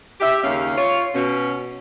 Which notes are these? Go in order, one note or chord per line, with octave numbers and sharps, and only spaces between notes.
G4 E5
D#2 C#3 C#4 F5
F4 C#5
B2 C#4